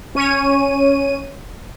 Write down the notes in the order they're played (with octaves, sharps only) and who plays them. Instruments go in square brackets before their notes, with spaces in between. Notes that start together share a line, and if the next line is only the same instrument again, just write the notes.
[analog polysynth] C#4 C#5 D#7